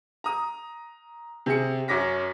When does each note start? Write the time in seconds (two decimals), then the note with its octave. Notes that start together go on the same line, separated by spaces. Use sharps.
0.24 A#5 D#6
1.46 C3 G#4 C#7
1.88 F#2 C#4 D6 A#6 B6